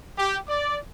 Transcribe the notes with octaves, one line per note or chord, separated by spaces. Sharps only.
G4
D5